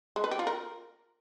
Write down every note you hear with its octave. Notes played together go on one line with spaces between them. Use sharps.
G#3
B4
G4
F4
A#4